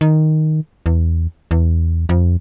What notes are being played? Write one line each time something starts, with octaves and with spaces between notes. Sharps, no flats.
D#3
E2
E2
F2